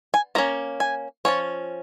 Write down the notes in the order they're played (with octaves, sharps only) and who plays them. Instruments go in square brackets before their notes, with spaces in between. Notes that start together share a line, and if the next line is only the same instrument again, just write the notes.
[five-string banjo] G#5
F3 A#3 C#4 A#5
G#5
F3 A#3 C#4 C#5